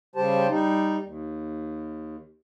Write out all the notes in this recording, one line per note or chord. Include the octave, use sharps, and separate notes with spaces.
C#3 G3 G4 C5 A5
G3 D#4
D#2